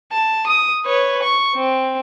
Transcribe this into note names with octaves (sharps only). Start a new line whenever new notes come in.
A5
D#6
B4 C#5
C#6
C4